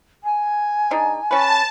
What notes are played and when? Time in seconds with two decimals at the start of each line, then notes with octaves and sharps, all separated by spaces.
0.24 G#5
0.91 G#3 D4 D#4
1.31 C#4 B4 A5